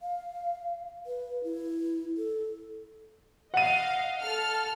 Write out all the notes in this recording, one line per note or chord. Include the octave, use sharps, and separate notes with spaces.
F5
B4
E4
A4
D#5 F5 F#5 D#7
A4 F6